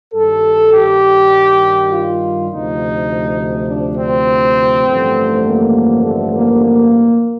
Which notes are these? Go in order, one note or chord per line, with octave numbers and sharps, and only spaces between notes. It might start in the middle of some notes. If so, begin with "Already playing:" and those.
G2 D#3 G3 A4
G4
F4
D2 C3 F3 D#4
D4
C4
A1 G2 D3 F3 A3
A#3
A3
A#3
A#3